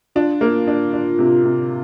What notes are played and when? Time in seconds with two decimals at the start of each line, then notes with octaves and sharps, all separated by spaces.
0.15 D4 F4
0.41 A#3
0.68 D4
0.93 D4
1.19 C3
1.44 C3